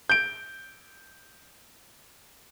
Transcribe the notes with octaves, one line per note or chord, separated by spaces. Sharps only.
G6 D7